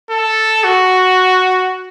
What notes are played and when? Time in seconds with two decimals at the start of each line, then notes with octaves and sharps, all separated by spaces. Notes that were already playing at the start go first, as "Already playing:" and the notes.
0.11 A4
0.64 F#4